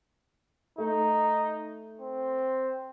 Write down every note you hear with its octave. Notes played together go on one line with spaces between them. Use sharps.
A3 D#4
C4